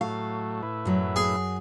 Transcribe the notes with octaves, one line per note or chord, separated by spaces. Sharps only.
A2 F#3 A3 F5
A2 E4 B4
F#2 F#3
G#4